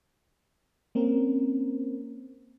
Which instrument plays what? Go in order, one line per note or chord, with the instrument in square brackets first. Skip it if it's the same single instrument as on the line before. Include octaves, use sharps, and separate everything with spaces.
[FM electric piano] A#3 C4 C#4 A#4